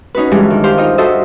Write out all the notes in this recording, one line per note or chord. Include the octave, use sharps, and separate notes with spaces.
C#4 D#4 F#4 B4
G2 E3 G3 G#3
D#3
G4 C5 F5
D#4 F4 D#5 G5
F#4 A4 C5 D#5 E5